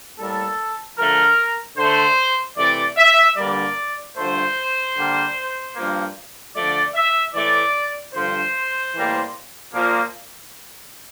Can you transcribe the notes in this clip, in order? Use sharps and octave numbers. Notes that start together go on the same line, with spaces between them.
A2 G3 A#3 A4
D3 F3 A3 A#4
D3 A3 C5
C3 E3 A3 D5
E5
G2 D3 G3 A#3 D5
G2 D3 F3 A3 C5
D3 G3 A#3
G2 F3 A#3
D3 F3 A3 D5
E5
A2 E3 A3 D5
G2 D3 F3 C5
A2 E3 G3 A#3
A#2 F3 A#3